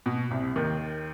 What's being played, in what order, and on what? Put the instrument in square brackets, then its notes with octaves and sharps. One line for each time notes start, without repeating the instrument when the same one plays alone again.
[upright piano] B2
C2 C3
D#2 D#3